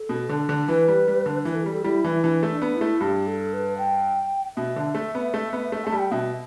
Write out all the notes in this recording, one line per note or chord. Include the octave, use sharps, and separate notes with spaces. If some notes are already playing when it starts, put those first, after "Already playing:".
Already playing: A4
B2
D3
D3
E3 B4
G3
G3
D3
E3 B4
A4
G3 G4
A4
G3 E4
E3
E3 D4
A3
D4
B3
E4
A3
G2 G4
A4
B4
G5
B2 E5
D3
A3
B3
A3
B3
A3
A3 A5
G3
G5
B2 E5